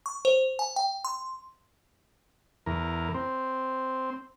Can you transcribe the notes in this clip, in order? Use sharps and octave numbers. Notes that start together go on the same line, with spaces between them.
C#6
C5
G#5
G5
C6
E2 A#4
C4